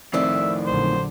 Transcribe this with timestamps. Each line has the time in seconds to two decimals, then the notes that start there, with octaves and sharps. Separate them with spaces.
0.13 F2 A2 D#3 C4 D4 E5
0.66 A#1 D3 F#3 C5